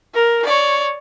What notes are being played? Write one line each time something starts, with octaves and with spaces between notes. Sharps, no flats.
A#4
C#5 D5